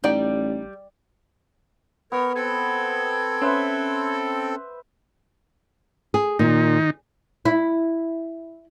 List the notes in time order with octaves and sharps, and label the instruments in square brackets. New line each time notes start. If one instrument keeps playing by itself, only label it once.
[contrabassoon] A1 [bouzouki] G3 [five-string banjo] D#4 D5 G5
[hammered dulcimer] B3 [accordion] A#4 C#5
[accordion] C4 A4 [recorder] G#6
[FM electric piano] C#4 [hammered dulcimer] B4 C5 E5
[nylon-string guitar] G#4
[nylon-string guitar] A#2 [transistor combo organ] D#3 D#4
[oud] E4